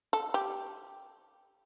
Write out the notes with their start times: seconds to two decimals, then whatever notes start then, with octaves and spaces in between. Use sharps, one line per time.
0.13 A4
0.34 G4